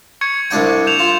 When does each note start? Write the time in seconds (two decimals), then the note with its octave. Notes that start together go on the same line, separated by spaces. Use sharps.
0.21 C#6 G#6 C#7
0.51 C2 D4 G5
0.87 G6 E7 F7
0.99 F4